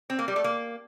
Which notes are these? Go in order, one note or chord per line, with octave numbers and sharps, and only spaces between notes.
C4
A#3
G3
A3
A#3